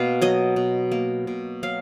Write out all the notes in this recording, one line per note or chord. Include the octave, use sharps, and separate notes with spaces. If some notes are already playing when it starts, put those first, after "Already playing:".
Already playing: B2 A#3 F5
F#3 D#5
B2
A#3
B2
F#3 F5